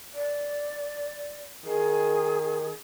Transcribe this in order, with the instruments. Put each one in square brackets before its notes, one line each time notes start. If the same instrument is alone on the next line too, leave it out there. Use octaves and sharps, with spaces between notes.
[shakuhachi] D5
[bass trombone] D#3 [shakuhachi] G#4